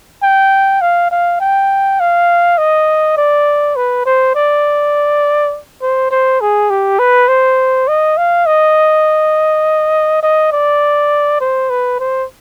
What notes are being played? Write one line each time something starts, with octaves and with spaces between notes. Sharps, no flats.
G5
F5
F5
G5
F5
D#5
D5
B4
C5
D5
C5
C5
G#4
G4
B4
C5
D#5
F5
D#5
D#5
D5
C5
B4
C5